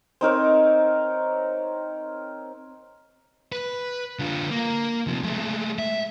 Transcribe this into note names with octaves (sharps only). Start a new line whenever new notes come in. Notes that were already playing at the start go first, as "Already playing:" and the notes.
C4 D#4 A#4 C#5
B4
D3 F4
A#3
C3 F3
G#3 A3
E5